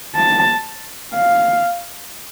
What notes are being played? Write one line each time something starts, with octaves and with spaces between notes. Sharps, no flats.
A5
F5